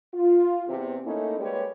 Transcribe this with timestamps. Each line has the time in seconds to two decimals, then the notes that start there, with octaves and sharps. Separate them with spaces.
0.14 F4
0.67 E2 C3
1.05 A3 A#3 C#4 D#4 E4
1.39 G3 G#3 A#3 G4 B4 C#5